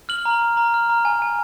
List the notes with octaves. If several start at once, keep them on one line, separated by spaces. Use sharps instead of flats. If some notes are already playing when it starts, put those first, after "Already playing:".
F6 F#7
A#5
F6
A#5
F6
A#5
G#5
G#5